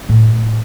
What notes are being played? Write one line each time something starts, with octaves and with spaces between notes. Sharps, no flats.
A2